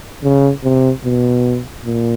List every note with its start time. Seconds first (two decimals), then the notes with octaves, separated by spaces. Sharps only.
0.23 C#3
0.63 C3
1.04 B2
1.85 A#2